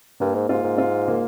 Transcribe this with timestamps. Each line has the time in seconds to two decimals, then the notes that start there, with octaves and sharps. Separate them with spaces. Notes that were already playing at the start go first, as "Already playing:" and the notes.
0.20 G2 A#3
0.35 G#2
0.49 G#2 F4
0.64 G#2
0.78 F4
1.08 A#3